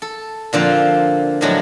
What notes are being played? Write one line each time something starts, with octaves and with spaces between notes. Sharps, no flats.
A4
A#2 D3 F3 C4
A2 D3 F3 F#3 G#3 A3